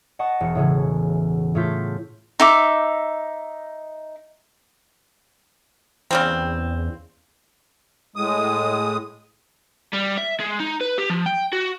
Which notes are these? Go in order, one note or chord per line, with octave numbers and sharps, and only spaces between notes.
D#5 F#5 A5 C#6
E1 C#7
A2 C#3 E3
A2 A3 F4 G6 B6
D#4 E5 D6
E2 C#3 G3 C4
A2 G#3 D#6
G3
E5
G#3
D#4
B4
G4
F3
G5
F#4